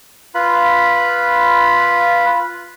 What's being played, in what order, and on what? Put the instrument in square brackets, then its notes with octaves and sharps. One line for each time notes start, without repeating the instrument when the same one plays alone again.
[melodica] F4 B4 F5 B5